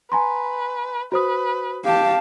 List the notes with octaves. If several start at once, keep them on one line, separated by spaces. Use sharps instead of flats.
B4 G#5 A#5 C6
F#4 B4 C5 D#6
G4 F5 A5